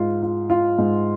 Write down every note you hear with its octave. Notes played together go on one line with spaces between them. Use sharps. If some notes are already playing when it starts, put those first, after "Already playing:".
Already playing: G#2 F4
F4
F4
G#2